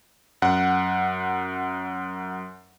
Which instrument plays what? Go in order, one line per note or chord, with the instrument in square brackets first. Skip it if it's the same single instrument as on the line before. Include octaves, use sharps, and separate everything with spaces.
[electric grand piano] F#2 F#5